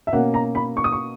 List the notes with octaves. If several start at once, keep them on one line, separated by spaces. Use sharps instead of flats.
E5
B2 A#3 C#4 F#5
A#5
B5
C#6
D#6
C#6